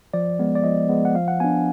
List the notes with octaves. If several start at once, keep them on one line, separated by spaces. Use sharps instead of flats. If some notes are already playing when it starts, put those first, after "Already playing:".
F3 D5
G#3 B3
D5
F3 D#5
G#3 B3
F#5
F3 F5
F#5
B3 D4 G#5